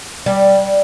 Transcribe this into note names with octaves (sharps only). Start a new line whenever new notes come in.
G3